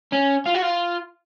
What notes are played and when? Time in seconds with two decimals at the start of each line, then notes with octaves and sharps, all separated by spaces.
0.12 C#4
0.46 F4
0.54 F#4
0.62 F4